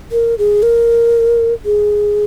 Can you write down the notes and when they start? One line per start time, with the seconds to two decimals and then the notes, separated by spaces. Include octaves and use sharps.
0.12 A#4
0.38 G#4
0.63 A#4
1.65 G#4